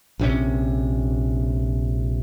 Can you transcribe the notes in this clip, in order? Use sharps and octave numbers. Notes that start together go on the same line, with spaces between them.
A#1 C3 C#4